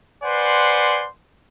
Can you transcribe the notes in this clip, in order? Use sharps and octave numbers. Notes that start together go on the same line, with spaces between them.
B4 C5 D5 F#5 G#5 C6